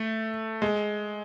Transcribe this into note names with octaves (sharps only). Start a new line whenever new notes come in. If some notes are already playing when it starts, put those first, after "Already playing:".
Already playing: A3
G#3